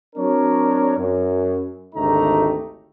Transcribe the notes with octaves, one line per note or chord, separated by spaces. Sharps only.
F#3 C4 D4 A#4 C#5
F#2
G#1 D2 A3 D#4 G4 A#5